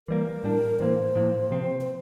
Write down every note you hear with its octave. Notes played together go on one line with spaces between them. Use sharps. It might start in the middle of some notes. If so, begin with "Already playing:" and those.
E3 G3 A#3 A#4
A2 G3 D4
A2 E3 A#3 C5
A2 F3 A#3
C3 F3 C4
C5